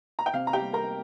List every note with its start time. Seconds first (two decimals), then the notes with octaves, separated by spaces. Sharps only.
0.19 A#5
0.26 G5
0.33 C3 F5
0.47 A#5
0.53 G4 G5
0.60 G3
0.73 A#4 A#5